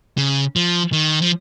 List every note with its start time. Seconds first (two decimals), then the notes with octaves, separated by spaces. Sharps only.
0.18 C#3
0.56 F3
0.92 D#3
1.22 F3